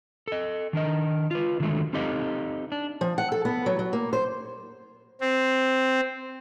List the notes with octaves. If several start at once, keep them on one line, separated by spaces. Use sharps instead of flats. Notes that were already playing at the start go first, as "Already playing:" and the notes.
A4 D#5
D#3 D4 A#4 D#5
F4 B4
D3 D#3 F#3 G#3 A3
C4 D#4 G4 A4 D#5 F5
D4
F3
F#5
A4
B3
F#3
F#3
A#3
C5
C4